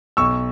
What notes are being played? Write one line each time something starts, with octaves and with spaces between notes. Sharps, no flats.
B1 C#6 E6